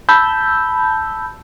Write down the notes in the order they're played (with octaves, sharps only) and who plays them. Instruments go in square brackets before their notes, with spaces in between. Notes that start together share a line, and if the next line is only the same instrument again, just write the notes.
[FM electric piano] A5 B5 E6 G6